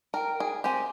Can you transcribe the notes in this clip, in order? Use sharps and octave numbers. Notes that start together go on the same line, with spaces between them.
A#4 G5
G#4
C4 G4 G#5